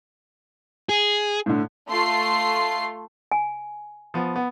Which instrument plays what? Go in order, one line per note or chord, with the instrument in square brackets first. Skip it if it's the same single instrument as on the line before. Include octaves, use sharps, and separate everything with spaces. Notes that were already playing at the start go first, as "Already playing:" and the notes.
[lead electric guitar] G#4
[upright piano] A2 D3
[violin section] A3 F4 C6 C7
[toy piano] G#5
[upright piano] F3 B3
B3